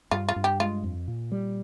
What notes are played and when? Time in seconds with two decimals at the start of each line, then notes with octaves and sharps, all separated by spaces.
0.11 G2 F4
0.29 F4
0.36 G2
0.44 G4
0.60 G#3 F4
0.84 F2
1.08 A#2
1.32 G3